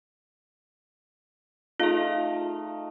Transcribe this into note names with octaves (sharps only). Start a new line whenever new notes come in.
A3 D#4 F4 G#4 F5